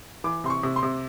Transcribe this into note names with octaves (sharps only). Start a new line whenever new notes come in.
E3 D6
C3 C6
C#6
C3
C6
C3